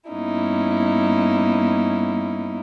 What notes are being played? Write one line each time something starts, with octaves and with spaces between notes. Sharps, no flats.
G2 A#3 B3 C#4 D#4 E4